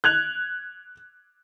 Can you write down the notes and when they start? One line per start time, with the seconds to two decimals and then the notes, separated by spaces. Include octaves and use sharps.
0.04 F#6 G#6 F7